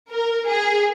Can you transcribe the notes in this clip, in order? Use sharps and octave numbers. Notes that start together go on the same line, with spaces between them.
A#4
G#4